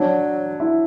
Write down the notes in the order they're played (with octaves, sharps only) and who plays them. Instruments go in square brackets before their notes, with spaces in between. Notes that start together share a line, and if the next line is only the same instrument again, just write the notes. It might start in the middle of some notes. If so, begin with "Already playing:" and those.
Already playing: [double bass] F#3 [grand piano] D4
[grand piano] E4